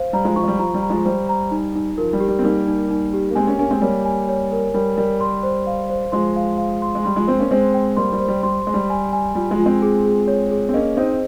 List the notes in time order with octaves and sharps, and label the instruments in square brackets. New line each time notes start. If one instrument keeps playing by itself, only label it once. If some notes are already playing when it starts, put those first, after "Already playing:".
Already playing: [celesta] C5 F5
[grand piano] G3 [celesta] A#5
[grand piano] F3 G#3
[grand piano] F3 [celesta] C#6
[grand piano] G#3
G3
[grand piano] F3 [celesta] A#5
[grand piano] G3
[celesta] A#5
[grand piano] F3 G#3
[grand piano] G3 [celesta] C5
[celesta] A#5
D#4
D#4
[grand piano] F3 [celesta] A#4
[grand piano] G3
[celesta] G4
[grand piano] G3
C4
[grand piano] G3 A#3 [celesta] D#4
[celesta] D#4
D#4
G4
[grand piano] A#3
[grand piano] G#3 C4 [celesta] G#5
[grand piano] A#3 C#4
[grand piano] A#3 C#4 [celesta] G#5
[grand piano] G#3 C4
[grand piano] G3 A#3 [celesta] C#5
[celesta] G#5
C#5
A#4
[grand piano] G3 [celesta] A#4
[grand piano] G3 [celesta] A#4
[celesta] C6
C5
F5
C5
[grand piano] F3 G#3 [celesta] C6
[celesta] F5
F5
C6
[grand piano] G#3
[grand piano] G3 [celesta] C6
[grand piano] F3 G#3
[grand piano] G#3 C4 [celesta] C5
[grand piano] A#3 C#4
[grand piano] G#3 C4 [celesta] C5
[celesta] G5
[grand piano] G3 A#3 [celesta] C6
[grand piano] G3 A#3
[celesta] C5
[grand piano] G3
[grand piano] G3 [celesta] C6
[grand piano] G#3 [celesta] C6
[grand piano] G3
[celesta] G#5
G#5
[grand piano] G3 [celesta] F4
[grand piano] F3 G#3
[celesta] F4
[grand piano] G#3 C4
[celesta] G#4
G#4
C#5
G#4
[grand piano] C4
[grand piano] A#3 C#4 [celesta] D#5
[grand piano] C4 D#4 [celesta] C5